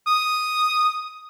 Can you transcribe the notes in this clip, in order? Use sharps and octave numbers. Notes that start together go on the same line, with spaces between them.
D#6